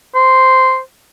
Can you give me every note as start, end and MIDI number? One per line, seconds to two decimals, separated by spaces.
0.15 0.79 72